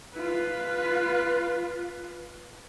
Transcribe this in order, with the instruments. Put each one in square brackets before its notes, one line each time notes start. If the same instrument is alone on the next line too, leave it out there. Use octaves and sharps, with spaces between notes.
[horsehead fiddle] F4 B4